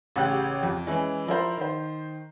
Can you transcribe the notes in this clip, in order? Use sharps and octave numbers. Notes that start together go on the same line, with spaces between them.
A1 C#3 G4 F#6
F2
E3 G#3 C#4 E4
F3 E4 A#4 C5
D#3 C5